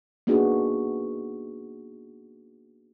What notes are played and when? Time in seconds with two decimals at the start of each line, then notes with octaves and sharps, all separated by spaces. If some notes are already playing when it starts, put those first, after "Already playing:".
0.27 A#3 B3 D4 D#4 F#4 G#4